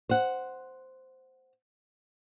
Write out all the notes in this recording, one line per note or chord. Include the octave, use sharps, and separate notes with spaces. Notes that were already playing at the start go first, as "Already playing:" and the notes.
C5 F#5